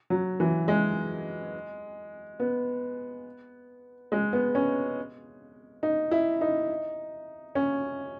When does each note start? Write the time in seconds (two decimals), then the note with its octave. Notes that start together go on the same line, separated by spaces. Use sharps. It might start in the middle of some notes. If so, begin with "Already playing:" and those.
0.10 F#3
0.40 E3
0.68 G#3
2.40 B3
4.12 G#3
4.33 B3
4.55 C#4
5.83 D#4
6.11 E4
6.41 D#4
7.55 C#4